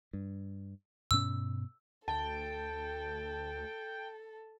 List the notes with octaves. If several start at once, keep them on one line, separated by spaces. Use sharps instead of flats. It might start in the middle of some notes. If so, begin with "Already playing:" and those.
G2
G2 B2 C#4 E6
D2 A4 G5 A5